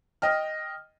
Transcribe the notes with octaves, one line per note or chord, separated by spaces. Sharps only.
D#5 G5 F6